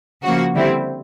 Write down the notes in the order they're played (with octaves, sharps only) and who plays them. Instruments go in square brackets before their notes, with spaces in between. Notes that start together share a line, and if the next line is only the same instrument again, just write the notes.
[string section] C#3 F3 A#3 F#4
D3 G3 C4 E4